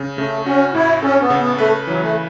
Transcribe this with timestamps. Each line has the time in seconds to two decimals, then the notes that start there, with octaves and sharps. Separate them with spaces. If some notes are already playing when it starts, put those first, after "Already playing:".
Already playing: C#3
0.18 C#3 A3
0.46 C#4 F#4
0.74 A2 E4
1.02 C#4 A4
1.21 B3
1.30 C#3
1.40 B3
1.59 A3 B4
1.87 E3 F#3
2.02 A3